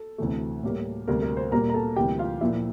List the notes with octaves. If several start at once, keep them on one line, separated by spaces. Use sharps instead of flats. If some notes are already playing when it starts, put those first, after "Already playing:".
Already playing: A4
D2 C3 E3 A3
A2 G3 A#3
D2 C3 G3 A#3 A#4
A#4
C5
A#2 G3 A#3 A#4 A#5
A#5
A4 A5
D2 C3 E3 G3 A#3 G4 G5
F4 F5
A#2 F3 A#3 E4 E5